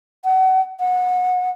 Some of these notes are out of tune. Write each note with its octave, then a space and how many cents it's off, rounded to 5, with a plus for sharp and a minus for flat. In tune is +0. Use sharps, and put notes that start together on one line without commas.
F#5 +30
F#5 -25